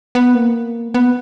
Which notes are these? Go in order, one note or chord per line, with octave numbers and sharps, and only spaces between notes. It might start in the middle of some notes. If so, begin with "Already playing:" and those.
B3
A#3
B3